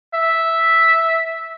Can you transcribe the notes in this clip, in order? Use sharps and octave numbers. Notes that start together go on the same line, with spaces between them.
E5